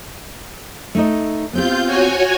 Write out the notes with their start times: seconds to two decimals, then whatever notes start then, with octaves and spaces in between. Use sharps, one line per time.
0.95 A3 D#4 D#5
1.53 B3 C4 F4 G4 G6
1.86 F#4 C#5 G#5